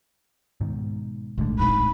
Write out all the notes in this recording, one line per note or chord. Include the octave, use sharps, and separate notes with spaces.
G#2 B2 D#3
A#1 G#2 D3 A3
D1 D#4 B5